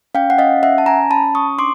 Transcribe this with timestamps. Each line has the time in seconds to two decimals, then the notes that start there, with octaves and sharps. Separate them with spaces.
0.15 C#4 F5 G5
0.30 F#5
0.38 C#4 D#5 F5
0.63 C#4 E5 F#5
0.78 A5
0.86 C#4 G#5 A#5
1.10 C#4 A5 B5
1.34 C#4 C#6 D#6
1.58 D4 C6 D6